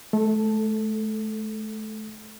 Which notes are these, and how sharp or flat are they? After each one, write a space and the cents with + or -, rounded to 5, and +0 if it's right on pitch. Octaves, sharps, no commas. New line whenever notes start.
A3 -35 A4 +0